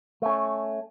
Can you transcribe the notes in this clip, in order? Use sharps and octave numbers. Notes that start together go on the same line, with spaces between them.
A3 C#4